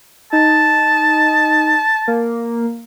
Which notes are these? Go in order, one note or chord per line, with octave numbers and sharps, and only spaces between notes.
D#4 A5
A#3